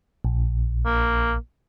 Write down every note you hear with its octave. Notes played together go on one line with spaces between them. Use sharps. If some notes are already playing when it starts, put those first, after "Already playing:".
A#1
A#3